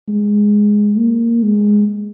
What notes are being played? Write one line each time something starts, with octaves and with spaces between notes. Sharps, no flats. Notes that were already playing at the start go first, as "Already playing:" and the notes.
G#3
A#3
G#3